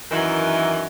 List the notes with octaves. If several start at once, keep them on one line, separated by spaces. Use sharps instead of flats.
F#2 D#3 E3